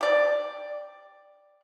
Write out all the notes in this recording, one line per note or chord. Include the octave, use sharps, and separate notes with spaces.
G4 D5